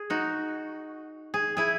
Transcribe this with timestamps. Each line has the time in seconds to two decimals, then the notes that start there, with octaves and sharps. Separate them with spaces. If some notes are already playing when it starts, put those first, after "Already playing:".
Already playing: G#4
0.10 D#4 F#4
1.34 G#4
1.57 E4 G#4